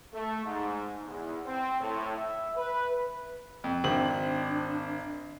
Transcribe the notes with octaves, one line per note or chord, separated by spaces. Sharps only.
A3
G#2
E2
C4
A2
E5
B4
F2
G#1 C4 D4 F#7